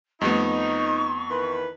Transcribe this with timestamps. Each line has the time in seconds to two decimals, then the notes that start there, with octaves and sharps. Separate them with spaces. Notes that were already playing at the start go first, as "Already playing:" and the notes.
0.21 F2 G3 A3 B3 D#4 G4 C#6
1.30 D#3 E3 B4